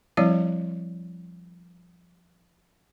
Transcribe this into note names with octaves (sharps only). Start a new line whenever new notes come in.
F3 G3 C4 E4 C#5 D5